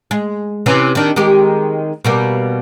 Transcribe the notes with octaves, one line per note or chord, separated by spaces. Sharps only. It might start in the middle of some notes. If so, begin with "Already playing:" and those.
G#3
C3 E3 C#4
D#3 D4
D#3 G#3 G4
B2 G3 A#3